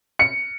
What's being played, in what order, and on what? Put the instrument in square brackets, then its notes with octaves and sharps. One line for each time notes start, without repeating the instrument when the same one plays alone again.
[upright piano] C#7